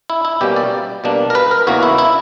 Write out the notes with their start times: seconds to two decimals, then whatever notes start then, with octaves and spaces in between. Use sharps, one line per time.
0.10 E4
0.25 E4
0.41 B2 G3 A#3 C#4 G4
0.56 D5
1.04 B2 G3 A#3 D4
1.30 A#4
1.35 B4
1.51 A#4
1.67 E2 C#3 E3 A#3 F#4
1.83 E4
1.98 E4